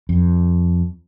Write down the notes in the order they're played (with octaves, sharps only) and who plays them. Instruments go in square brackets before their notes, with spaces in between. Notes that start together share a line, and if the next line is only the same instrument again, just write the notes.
[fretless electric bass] F2